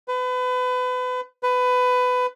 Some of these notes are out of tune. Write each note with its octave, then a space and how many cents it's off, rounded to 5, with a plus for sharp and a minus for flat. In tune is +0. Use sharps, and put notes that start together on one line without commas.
B4 +30
B4 +20